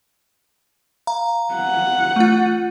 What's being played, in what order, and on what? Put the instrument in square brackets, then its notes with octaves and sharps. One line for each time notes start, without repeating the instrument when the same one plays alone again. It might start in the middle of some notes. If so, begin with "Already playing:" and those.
[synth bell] F5 A#5
[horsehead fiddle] F#5
[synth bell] A3 F4